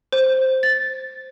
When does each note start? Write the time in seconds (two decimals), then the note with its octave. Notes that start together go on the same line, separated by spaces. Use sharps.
0.13 C5
0.63 A6